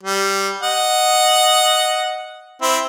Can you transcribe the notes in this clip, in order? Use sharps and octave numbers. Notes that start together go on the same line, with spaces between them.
G3
D#5 F#5
C4 E4